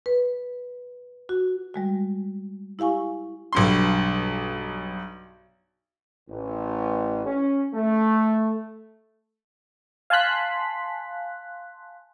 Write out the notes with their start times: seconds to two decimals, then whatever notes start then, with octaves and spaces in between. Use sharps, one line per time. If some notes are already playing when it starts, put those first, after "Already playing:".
0.06 B4
1.29 F#4
1.74 G3 G#3 F#4
2.79 E4 G4 F5 G#5 C#6
3.53 B1 G2 C6
6.29 A1
7.26 C#4
7.74 A3
10.10 F5 G#5 A5 C6 F#6 B6